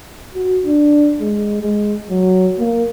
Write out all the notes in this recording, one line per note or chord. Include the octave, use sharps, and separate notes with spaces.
F#4
D4
G#3
G#3
F#3
A#3